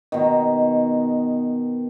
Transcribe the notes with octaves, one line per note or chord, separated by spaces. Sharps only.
B2 D#3